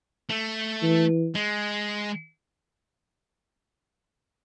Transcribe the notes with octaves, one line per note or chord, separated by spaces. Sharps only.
A3
E3
G#3